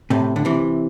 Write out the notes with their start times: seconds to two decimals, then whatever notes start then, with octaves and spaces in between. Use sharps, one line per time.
0.10 A2 C3
0.36 D3
0.45 C3 E3